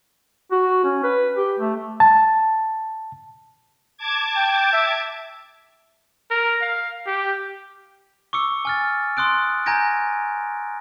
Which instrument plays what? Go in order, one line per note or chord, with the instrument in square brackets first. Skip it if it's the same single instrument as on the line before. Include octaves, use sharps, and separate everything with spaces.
[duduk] F#4
C#4
B4
G4
A3
[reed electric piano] A5
[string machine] A5 D6 G#6
[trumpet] G5
E5
A#4
F5
G4
[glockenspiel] C#6 D6 E6 C#7
G#5 F6 A6
C6 D#6 F#6 D7
G#5 A#5 G6 G#6 A#6 D7